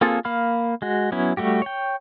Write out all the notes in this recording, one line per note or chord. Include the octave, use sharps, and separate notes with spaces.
A#3 C4 F4 G#4 A4
A#3 F5 B5 F6
G#3 F#4
F#3 B3 C#4 E4
G3 A3 F#4 G4
C#5 G5